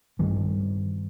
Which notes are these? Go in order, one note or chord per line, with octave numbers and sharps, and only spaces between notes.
G2 D#3 G3